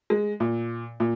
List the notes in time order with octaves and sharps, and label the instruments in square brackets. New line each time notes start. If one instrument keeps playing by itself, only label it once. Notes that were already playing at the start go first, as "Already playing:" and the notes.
[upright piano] G#3
A#2
A#2